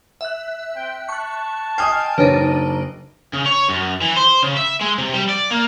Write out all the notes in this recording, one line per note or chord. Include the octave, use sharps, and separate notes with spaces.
E5 F#6
C4 G5
A5 C#6 F#6
D#5 G5 G#5 D#6 F6 C7
F#1 D4 D#4 B4 C#5
C#3
C#5
F#2
E3
C5
C#3
E5
G#3
C3
G3
D5
A#3